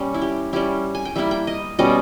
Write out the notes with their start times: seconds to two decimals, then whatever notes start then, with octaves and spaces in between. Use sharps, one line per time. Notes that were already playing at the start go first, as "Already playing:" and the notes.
Already playing: G3 A#3 C#4
0.14 E4
0.22 G4
0.53 G3 C#4 E4 G4
0.95 G#5
1.05 G5
1.16 G3 A#3 E4 E5
1.31 G5
1.47 D#5
1.79 B2 G3 C#4 D#5